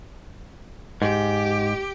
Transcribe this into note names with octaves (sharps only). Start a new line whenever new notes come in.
G#2 G4